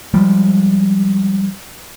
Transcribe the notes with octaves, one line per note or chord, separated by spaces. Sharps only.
F3 G3 G#3